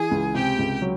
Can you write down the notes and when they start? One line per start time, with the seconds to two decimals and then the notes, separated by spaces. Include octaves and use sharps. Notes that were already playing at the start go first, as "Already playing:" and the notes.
Already playing: E3 G#4 G#5
0.11 C#2
0.34 C3 G4 G5
0.58 C#2
0.82 F#3